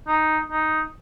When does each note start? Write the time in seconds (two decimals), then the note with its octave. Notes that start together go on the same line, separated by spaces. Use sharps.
0.08 D#4
0.50 D#4